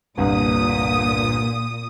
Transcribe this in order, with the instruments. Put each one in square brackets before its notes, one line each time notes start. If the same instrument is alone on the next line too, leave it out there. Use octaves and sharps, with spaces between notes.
[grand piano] G1 C2 G2 [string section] A#2 D#6